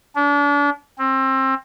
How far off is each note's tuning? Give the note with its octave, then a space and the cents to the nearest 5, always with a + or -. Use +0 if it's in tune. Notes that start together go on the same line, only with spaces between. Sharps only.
D4 -35
C4 +25